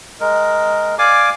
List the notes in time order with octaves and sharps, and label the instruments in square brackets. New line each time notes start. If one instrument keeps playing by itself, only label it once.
[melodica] G#3 A#4
D5 F5 G#5 D6